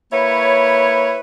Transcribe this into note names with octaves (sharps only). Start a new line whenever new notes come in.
A#3 E4 B4 C#5